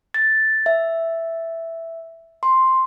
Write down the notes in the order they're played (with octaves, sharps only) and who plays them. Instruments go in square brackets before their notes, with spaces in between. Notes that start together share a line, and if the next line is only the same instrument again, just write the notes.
[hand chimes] A6
E5
C6